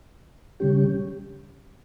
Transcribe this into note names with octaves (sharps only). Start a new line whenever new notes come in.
C#3 G3 C#4 G4